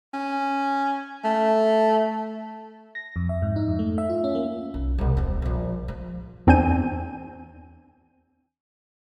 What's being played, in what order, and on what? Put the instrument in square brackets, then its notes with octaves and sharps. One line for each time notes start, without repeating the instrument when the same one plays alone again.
[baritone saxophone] C#4
A3
[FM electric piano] A#6
F2
E5
G#2
D#4
F2
A3
E5
F4
C#4
A#3
[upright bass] B1
C2 B2
D#1 C4
A#1 C#3
F3
[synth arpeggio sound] E2 C4 D4 G#5 G6 D#7